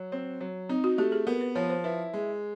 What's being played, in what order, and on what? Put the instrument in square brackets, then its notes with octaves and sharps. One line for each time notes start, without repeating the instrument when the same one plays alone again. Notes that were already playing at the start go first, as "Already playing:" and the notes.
Already playing: [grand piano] F#3
C4
F#3
[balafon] C4 [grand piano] D#4
[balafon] F#4
[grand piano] A3 [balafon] G4
[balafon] G#4
[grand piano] B3 [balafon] A#4
[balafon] B4
[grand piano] F3 [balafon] C#5
[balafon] C5
[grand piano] E4 [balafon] B4
[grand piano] G#3